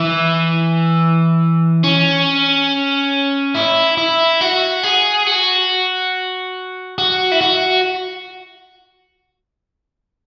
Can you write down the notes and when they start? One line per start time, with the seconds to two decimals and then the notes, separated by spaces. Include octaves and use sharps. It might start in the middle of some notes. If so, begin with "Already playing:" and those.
Already playing: E3
1.84 C#4
3.55 E4
3.98 E4
4.41 F#4
4.83 G#4
5.27 F#4
6.98 F#4
7.32 E4
7.41 F#4